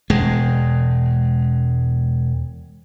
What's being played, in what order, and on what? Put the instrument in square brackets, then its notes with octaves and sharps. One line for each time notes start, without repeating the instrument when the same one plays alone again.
[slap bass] E1 G#3